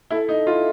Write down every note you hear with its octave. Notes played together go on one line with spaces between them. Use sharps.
E4 A4
D#4
E4 F4